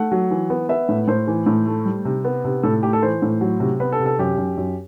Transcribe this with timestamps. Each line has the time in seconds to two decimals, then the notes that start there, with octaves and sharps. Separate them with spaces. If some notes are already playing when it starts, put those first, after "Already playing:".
Already playing: A3 F#5
0.12 F#3
0.31 E3
0.50 B3
0.69 B3 E5
0.89 A2
1.08 A2 C5
1.27 E3
1.46 A2
1.66 A3
1.85 G3
2.05 C3
2.24 B3
2.45 C3
2.63 A2 A4
2.83 A3 G4
2.93 A4
3.02 E3 C5
3.22 A2
3.41 F#3
3.60 C3
3.80 B3 B4
3.92 A4
4.00 C3
4.06 A4
4.19 F#2 G4
4.38 F#2
4.57 F#2